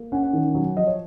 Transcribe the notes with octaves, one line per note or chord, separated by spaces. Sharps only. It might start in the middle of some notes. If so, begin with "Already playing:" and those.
Already playing: A#3
C#4 F#5
F#5
D#3
F#3
F3 D#5
C#5